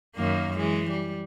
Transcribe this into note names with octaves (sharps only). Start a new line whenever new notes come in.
F#2 D#3 A#3
E3 G#3
G3